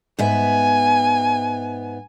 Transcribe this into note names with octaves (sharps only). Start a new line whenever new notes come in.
G#2 B3 E5 G#5